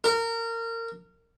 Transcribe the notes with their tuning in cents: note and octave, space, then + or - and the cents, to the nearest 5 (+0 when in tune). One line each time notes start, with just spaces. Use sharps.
A#4 -25